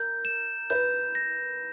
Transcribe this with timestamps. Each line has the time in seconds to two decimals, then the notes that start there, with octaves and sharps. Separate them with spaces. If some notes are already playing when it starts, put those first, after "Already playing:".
Already playing: A#4 G6
0.25 E7
0.70 B4 G6
1.15 A#6